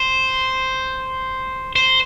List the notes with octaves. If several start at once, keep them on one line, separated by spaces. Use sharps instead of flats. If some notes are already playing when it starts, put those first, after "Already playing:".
Already playing: C5
C5